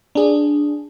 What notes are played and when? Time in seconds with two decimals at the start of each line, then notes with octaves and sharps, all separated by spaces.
0.15 D4 G#4